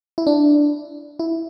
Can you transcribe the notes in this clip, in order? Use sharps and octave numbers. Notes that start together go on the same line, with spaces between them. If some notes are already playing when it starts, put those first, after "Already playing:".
E4
D4
E4